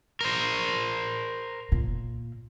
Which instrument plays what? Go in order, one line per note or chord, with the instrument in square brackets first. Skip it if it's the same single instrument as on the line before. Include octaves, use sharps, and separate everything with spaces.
[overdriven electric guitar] A#4 C5
[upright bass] A#2